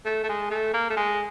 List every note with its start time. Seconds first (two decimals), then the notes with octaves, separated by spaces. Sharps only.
0.05 A3
0.23 A3
0.29 G#3
0.50 A3
0.74 A#3
0.90 A3
0.97 G#3